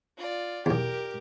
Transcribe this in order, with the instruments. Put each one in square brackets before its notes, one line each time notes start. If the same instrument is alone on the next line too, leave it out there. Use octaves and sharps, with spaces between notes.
[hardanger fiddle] F4 D5
[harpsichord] B1 E2 [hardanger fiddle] G4 A#4